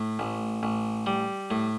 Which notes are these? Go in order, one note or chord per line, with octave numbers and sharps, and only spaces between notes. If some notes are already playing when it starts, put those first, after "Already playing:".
Already playing: A2
A1
A1
G3
A2